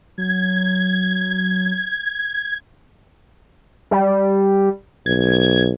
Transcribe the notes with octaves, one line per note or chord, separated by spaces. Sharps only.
F#3 G#6
G3
B1 G#6